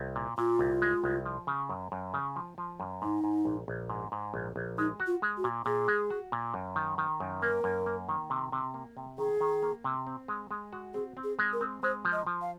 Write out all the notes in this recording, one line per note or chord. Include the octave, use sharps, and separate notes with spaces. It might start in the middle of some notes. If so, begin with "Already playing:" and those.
Already playing: C2
A#2
A#2 F4
C2
G#3
C2
F3
C#3
F#2
F#2
C#3
F3
F3
F#2
G#2 D#4
G#2
A#1
A#1
G#2
G#2
A#1
A#1
G#3 D#4
F#4
F4
G#3
F#4
A#2
A#2 G#4
G#3
F#4
A#2
F#2
D#3
D#3
F#2
A#3 A#4
F#2
A#3
D#3
C3
C3
A#3
C3
D#3 G#4
D#3
A#3
C3
C4
G#3
G#3
F#4
C4 G#4
C4
G#4
G#3
A#4
C4
G#3 C5
F3
D#5
F3
F5